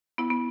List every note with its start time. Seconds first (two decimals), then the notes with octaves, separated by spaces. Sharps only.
0.18 B3 E4
0.30 B3